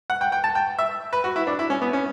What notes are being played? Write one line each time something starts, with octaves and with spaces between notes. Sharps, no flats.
F#5
G5
G5
A5
G5
E5
B4
F#4
E4
D4
E4
C#4
B3
C#4